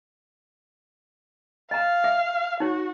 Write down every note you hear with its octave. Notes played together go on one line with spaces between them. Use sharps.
D#5 F5 A#5
E5
D#4 F#4 C#5